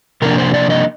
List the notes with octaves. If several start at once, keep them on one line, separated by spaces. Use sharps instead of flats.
C3 F3 A#3 D4 A#4
C5
D5
D#5